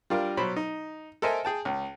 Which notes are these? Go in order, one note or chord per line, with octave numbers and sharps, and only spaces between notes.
G3 D4 F4 A#4
B2 F#3 C5 B5
D#4
A4 A#4 C5 D#5 E5 G#5
G#4 G5 A5
C#2